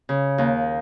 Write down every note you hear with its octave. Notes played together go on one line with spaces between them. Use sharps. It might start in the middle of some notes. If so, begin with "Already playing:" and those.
C#3
D#2